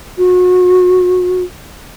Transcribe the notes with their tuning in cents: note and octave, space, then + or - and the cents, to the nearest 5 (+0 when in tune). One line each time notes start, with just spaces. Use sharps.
F#4 -30